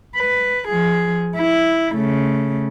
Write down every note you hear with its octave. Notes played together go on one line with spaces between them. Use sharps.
B4
F3 G#4
E4
C#3 A3